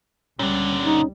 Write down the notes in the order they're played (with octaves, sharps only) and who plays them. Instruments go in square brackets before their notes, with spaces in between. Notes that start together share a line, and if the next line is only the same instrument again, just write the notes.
[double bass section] C#2 G3 [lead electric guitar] A#2 D3 [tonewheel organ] C#4
[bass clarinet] D#4